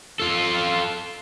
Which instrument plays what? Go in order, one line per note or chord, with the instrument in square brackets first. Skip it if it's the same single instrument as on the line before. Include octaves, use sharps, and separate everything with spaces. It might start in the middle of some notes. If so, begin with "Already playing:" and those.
[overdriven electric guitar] F4 A4